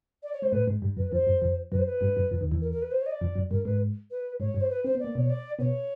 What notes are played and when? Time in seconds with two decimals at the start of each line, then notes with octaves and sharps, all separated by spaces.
0.23 D5
0.33 C#5
0.42 G#3 C5
0.52 A2 A3 B4
0.67 G#2 G#3
0.82 G2 G3
0.97 F#2 F#3 B4
1.12 F2 F3 C5
1.27 F#2 F#3
1.42 F2 F3
1.72 F#2 F#3 B4
1.78 C5
1.86 B4
2.01 G2 G3
2.16 F#2 F#3
2.31 F2 F3
2.41 D#2 D#3
2.51 E2 E3
2.61 A#4
2.71 A#4
2.82 B4
2.91 C5
3.01 C#5
3.06 D#5
3.11 D5
3.21 F2 F3
3.35 F#2 F#3
3.50 G2 G3 A#4
3.65 G#2 G#3 B4
4.11 B4
4.40 G#2 G#3 C#5
4.54 G2 G3
4.61 C5
4.70 B4
4.84 C4 C5
4.95 B3 D5
5.04 A#3
5.15 B2 B3 C#5
5.29 D5
5.59 B2 B3 C#5